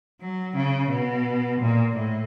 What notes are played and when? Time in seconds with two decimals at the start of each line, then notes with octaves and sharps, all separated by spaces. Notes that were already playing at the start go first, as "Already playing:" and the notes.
0.21 F#3
0.56 C#3
0.90 B2
1.61 A#2
1.96 A2